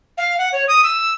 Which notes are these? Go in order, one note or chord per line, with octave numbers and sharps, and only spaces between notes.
F5
F#5
C#5
D#6
E6